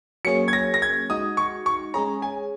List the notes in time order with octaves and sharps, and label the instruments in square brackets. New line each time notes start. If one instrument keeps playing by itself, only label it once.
[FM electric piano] F#3 A#3 C#4 G#4 C#5 [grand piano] C#7
[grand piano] G#6
A#6
A#6
G#6
[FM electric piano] G#3 D#4 F#4 [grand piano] D#6
[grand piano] C#6
C#6
[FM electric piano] G#3 C#4 G#4 C#5 [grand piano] A#5
[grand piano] G#5